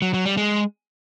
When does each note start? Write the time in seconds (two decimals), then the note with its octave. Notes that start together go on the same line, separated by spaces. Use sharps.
0.02 F#3
0.14 F#3
0.25 G3
0.37 G#3